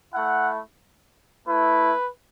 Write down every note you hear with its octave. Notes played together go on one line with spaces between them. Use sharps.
A3 E4 F#5
A3 E4 B4